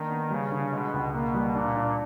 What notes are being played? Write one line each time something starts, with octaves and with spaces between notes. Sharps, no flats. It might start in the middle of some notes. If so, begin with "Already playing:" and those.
Already playing: D#3 A#3 D4
B3
C#3 G3
D3
B2 G#3
C#2
B2 A#3
G3
A#2 D4
D4